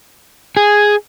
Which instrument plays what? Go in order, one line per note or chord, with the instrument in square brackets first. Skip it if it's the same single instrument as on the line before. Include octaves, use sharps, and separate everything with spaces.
[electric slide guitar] G#4